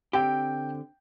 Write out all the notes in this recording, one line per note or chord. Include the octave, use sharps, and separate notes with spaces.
D3 C4 G4 G5